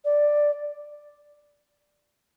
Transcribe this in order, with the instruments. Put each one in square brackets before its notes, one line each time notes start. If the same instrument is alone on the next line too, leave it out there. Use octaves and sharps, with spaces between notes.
[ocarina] D5